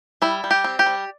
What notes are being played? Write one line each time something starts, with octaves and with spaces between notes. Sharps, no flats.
G3 E4
G3
G4
C4
G4
G3